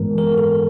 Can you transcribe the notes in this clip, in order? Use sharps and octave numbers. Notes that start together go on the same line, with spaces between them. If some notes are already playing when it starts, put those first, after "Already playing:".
Already playing: G#2 E3 G#3 B3 A#4
A#4
A4